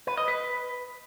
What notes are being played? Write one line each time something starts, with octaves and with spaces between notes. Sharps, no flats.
B4
D#5
B4